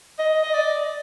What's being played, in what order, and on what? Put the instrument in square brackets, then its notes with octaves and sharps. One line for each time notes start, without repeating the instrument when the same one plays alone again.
[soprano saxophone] D#5
D#5
D5